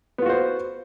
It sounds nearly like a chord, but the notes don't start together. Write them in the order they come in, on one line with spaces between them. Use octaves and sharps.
B3 F4 F#4 C5